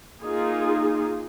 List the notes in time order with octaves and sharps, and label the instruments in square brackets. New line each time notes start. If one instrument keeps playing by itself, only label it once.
[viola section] A#3 D#4 F4 G#4